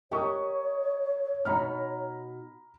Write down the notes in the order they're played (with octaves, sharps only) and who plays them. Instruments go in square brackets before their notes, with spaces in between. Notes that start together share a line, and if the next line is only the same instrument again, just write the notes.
[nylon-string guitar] G4 A#4 B4 [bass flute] C#5 [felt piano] D#5 C#6 D#6
[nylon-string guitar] B2 D#4 F#4 [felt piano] A#5 B5 F6